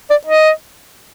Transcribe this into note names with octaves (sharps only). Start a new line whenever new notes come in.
D5
D#5